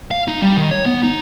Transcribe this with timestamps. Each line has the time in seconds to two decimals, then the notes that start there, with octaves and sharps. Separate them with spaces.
0.11 F5
0.28 D#4
0.42 G3
0.57 D#3
0.71 C#5
0.86 B3
1.03 D#4